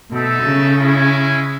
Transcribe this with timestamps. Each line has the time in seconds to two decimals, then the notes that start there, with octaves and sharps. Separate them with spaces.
0.10 B2 D#4 A4 E5
0.43 C#3
0.76 G#3 C#4 E4